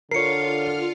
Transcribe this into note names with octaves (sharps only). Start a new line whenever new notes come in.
D3 F4 A#4 C#5 F5 C7 C#7